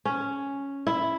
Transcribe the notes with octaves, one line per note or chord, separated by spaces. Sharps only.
C#4
E4